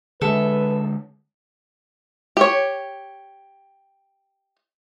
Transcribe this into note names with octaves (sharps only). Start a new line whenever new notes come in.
D3 G#3 A4 B4 E5
G4 C#5